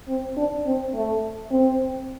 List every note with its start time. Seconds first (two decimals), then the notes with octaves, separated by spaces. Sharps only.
0.08 C4
0.37 D4
0.66 C4
0.94 A3
1.51 C4